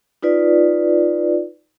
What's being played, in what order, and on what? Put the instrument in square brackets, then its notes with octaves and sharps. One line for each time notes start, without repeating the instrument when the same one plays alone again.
[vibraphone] D#4 F4 B4 D5